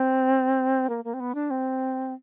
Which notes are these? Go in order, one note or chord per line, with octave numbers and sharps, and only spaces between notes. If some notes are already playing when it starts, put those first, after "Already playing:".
Already playing: C4
A#3
A#3
C4
B3
D4
C4